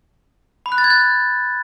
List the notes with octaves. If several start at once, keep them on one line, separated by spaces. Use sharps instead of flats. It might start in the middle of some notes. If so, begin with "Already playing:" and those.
B5
F#6
A6
G#6
F#6